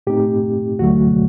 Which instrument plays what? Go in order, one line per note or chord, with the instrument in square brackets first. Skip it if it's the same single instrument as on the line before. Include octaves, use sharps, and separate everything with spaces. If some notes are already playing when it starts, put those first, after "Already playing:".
[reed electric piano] A2 A3 C4 D#4 G4
D2 D3 F#3 A3 F#4